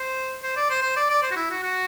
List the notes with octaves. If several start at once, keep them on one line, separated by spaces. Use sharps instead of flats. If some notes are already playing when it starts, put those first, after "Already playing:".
Already playing: C5
C5
D5
C5
C5
D5
D5
C5
F#4
E4
F#4
F#4